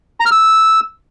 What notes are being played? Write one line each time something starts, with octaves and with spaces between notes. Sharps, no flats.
A#5
F6
E6